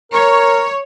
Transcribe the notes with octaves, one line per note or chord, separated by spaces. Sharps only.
A#4 C#5